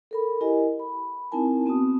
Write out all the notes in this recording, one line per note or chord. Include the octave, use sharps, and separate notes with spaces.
A4 A#4 B5
E4 G4 A#4 D#5 G#5
B5
C4 D#4 E4 A#4 G#5 A5
B3 C4 F#4 A5 D#6